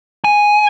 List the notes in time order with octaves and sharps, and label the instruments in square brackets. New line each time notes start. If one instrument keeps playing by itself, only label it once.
[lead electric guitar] G#5